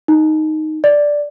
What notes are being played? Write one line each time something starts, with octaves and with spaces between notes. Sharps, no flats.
D#4
D5